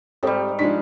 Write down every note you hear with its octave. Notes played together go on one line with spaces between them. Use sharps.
G#2 G3 C4 G4 A4
F3 G#3 D4 D#4 D5 B6